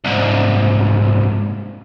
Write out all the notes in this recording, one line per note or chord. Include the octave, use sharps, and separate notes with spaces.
C2 G#2